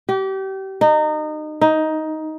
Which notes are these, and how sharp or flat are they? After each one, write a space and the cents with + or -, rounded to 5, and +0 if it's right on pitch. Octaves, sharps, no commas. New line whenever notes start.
G4 -30
D#4 -25
D#4 +10